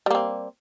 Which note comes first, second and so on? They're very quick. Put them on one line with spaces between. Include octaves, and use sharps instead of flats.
G3 A#3 C4